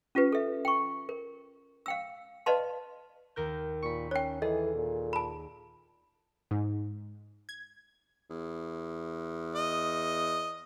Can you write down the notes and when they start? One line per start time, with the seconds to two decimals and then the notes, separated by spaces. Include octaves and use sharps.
0.15 C#4 F4 G4 B4
0.32 A4 E5
0.65 G5 C#6
1.09 A#4
1.86 F5 G5 E6
2.46 B4 D5 D#5 F5 A5 C6
3.36 D#2 A#4 G6
3.82 A#2 B5 C#6
4.11 C#4 C#5 G5
4.42 E3 G#4 A4 D#5
4.76 A#2
5.13 A5 B5
6.51 G#2
7.49 G#6
8.30 E2
9.56 D#5